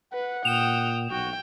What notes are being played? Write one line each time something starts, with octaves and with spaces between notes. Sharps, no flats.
B4 F#5
A#2 G5 D#6 E7 F7
B1 F#4 G5